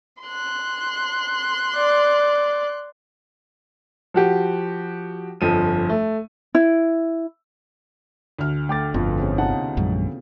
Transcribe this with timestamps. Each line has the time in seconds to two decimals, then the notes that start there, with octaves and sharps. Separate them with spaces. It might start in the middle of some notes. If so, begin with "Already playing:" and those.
0.22 C6 F#6
1.76 D5
4.14 F3 F#4 G4
5.41 G1 F2 F3 D#7
5.89 A3
6.55 E4
8.39 D2 F6
8.69 A3 G5 D6 A6
8.94 G1 F2 B2 B3 F4
9.18 C4 C#4 G#4
9.38 C3 D#4 F4 F#5 A5
9.77 A#1 F#2 G#3